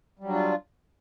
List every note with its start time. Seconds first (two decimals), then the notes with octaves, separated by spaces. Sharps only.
0.19 G3
0.24 F#3
0.29 D4
0.33 F4